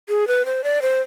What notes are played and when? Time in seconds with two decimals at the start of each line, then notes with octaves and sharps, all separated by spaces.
0.09 G#4
0.28 B4
0.46 C5
0.64 D5
0.82 C5